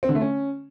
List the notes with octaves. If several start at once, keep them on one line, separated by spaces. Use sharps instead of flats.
C4
D3
A3
C#4